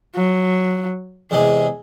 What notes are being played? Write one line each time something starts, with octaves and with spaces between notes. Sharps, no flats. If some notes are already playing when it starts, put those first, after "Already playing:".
F#3
E2 C3 G#3 G#4